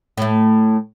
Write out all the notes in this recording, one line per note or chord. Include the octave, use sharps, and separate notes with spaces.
A2 A3